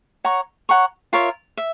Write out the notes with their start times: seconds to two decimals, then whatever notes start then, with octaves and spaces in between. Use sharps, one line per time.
0.24 C#5 F#5 A#5 C#6
0.69 C#5 F#5 A#5 C#6
1.13 F4 A#4 C#5 E5
1.57 E5